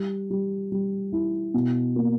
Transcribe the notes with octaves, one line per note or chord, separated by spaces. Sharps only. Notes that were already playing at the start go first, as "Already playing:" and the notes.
Already playing: G3
G3
G3
E4
B2
A#3